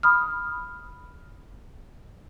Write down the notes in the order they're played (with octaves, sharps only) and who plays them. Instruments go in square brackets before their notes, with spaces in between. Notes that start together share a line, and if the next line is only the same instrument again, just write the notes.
[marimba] B5 D#6 F6